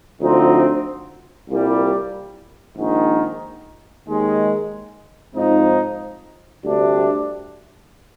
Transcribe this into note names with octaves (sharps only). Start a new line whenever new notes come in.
D2 D3 F3 C4 D#4
C2 A#2 G3
A#1 G#2 D#3
D#2 D#3 G#3
G#2 F3 C4 D#4
D2 C3 G3 D4